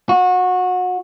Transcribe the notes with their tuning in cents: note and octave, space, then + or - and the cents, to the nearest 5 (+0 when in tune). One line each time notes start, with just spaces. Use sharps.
F#4 -25